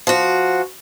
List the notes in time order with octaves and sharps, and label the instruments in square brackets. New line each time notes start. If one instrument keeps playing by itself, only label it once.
[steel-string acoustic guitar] F3 F#4